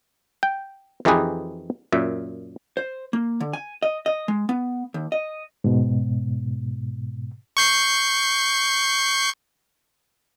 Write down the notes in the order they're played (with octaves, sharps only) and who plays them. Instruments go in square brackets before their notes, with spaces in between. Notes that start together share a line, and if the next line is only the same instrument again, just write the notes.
[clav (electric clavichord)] G5
F2 E3 D#4 G4 G#4 B4
F#2 A#2 E5
[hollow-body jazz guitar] C5
A#3
D3
G#5
D#5
D#5
G#3
B3
D#2
D#5
[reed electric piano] G#2 B2
[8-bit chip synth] C#6 G6 C7